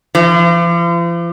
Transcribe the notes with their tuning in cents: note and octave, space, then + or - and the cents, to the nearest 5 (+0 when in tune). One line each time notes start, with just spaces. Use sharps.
F3 -45